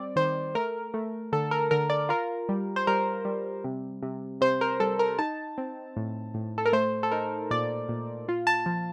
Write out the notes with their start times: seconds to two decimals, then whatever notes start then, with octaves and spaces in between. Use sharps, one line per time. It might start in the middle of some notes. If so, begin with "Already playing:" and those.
Already playing: G3 C4 D5
0.16 D#3 C5
0.55 A3 A#4
0.94 A3
1.32 D3 A4
1.51 A#4
1.71 D3 A#4
1.90 D5
2.09 F4 A#4
2.49 G3
2.76 C5
2.87 G3 A#4
3.25 G3
3.64 C3
4.03 C3
4.41 C3 C5
4.61 A#4
4.80 G3 A4
4.99 A#4
5.19 D#4 A5
5.58 C4
5.97 A2
6.34 A2
6.58 A4
6.65 A#4
6.73 A3 C5
7.03 A4
7.11 D#4 A#4
7.51 A#2 D5
7.89 A#2
8.29 F4
8.47 A5
8.66 F3